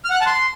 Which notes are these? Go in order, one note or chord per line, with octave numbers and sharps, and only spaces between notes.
F6
F#5
F#6
A5
C6